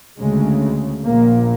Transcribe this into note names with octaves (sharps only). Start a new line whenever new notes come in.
D2 C#3 G#3
A#1 A#2 A#3